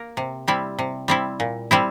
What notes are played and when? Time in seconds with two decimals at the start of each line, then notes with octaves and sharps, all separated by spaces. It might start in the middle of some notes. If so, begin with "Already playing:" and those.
Already playing: A#3 A#4
0.17 C3
0.48 G3 C4 E4
0.79 C3
1.08 G3 C4 E4
1.40 A#2
1.71 G3 C4 E4